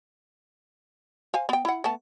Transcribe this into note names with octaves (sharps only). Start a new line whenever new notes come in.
C5 F5 G#5
B3 G5
E4 F#5
A3 B3 A5